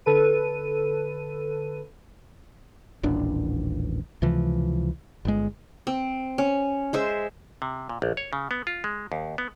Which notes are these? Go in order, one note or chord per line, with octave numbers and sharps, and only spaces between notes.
D3 A4 B4 D#7
D#1 A1 D4
C#2 C3 E3 F3
G1 G#3
C4
C#4
G#3 C5 E5
C3
A#2
A#1
C#5
C#3
B3
F4
G#3
D#2
B3